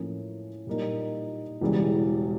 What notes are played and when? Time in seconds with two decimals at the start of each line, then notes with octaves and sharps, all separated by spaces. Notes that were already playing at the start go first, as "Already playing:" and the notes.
Already playing: A2 F3 A#3 C#4
0.67 A#2 G3 A#3 D#4
1.61 E1 E2 C#3 E3 G3